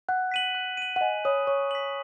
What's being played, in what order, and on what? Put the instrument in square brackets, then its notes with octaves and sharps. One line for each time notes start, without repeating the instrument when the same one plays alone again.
[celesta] F#5 [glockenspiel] F#6
[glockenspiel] B6 D#7 F#7
F#6
D#7 F#7
[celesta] F#5
[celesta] D#5 [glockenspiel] G#5
[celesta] C#5 [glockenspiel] B5 D#6 F#6
[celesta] C#5 [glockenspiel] C#6
[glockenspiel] B6 F#7